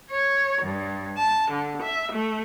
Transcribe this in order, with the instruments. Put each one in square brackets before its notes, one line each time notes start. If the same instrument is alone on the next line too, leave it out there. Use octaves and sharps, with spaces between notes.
[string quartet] C#5
G2
A5
D3
E5
A3